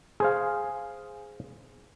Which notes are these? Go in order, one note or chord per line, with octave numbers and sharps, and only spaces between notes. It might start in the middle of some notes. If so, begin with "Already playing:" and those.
G#4 C5 F5